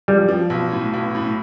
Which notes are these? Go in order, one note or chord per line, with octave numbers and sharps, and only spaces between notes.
F3 G3
F3
B1
A2
B1
A2